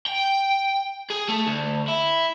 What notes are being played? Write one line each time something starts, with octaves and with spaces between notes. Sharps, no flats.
G5
G#4
A3
D2
E4